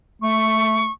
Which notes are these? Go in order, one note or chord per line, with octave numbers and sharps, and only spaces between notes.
A3 C#6